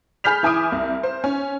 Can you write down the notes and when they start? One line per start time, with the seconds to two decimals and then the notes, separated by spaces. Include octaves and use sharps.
0.24 G#4 B5 F6 G6 B6 F7
0.43 E3 E4 G#5 D6 D#6 D7
0.72 C2
1.03 C5
1.24 C#4